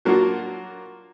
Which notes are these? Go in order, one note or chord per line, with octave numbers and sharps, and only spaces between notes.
F#3 A#3 D4 F4 F#4